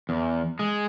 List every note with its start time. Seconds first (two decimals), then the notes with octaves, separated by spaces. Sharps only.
0.09 E2
0.59 G#3